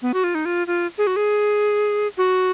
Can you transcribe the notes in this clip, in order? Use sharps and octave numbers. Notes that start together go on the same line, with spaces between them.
B3
F#4
F4
D#4
F4
F4
G#4
F#4
G#4
F#4